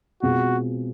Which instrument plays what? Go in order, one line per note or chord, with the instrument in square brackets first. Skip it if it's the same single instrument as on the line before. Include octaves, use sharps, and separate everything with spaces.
[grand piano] B2 G#3 C4 F4 [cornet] F#4